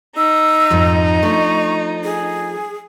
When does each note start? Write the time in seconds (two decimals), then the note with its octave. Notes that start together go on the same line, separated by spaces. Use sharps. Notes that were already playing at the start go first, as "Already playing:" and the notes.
0.17 D#4 E6
0.70 F2 G#2 F3
1.23 F3 A3 D4 C#6
2.04 G#4